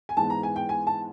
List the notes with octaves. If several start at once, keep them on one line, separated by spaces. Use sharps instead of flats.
G#5
G#2 E3 G#3 B3 A5
A#5
G#5
G5
G#5
A5